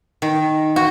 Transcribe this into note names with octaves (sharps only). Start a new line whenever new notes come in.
D#3
F#4